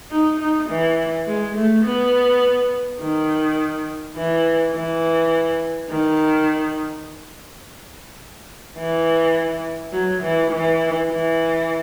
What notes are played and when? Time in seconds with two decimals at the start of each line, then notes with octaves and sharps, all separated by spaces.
0.11 D#4
0.40 D#4
0.69 E3
1.27 G#3
1.56 A3
1.84 B3
3.00 D#3
4.16 E3
4.74 E3
5.89 D#3
8.77 E3
9.93 F#3
10.23 E3
10.51 E3
11.09 E3